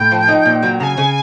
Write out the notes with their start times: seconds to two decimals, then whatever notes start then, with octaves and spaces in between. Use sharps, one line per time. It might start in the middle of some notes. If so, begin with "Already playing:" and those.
Already playing: A2 G5
0.11 F3
0.28 D#4
0.45 A#2
0.63 F#3
0.79 C#3 G#5 A#5
0.97 C#3